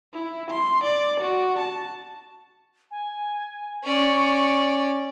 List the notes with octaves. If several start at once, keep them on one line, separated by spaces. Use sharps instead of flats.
E4
C6
D5
F#4
A5
G#5
C#4 D5 C#6